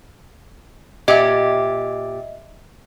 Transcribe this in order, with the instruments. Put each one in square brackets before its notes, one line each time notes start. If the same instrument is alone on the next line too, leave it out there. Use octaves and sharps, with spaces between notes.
[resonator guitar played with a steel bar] A#2 G4 [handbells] D#5 E5